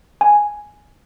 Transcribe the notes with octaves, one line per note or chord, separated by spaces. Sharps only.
G#5